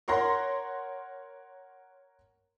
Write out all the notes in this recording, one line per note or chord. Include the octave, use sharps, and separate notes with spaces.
A#4 C#5 F#5 A#5 C6 A#6